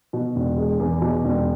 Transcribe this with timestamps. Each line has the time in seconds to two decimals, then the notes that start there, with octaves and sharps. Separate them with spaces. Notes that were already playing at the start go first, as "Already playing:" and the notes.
0.13 B2
0.36 E1
0.57 G#3
0.79 E2
1.01 B2
1.25 E1